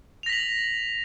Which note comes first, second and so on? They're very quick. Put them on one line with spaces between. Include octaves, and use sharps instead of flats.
F7 A#6 B6 F#7